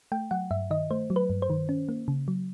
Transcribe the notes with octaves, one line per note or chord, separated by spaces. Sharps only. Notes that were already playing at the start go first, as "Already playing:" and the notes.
A3 G5
F#3 F#5
G2 E5
D#3 D#5
A3 C5
F#3
B4
G2
C5
D#3
C#4
A#3
C#3
F#3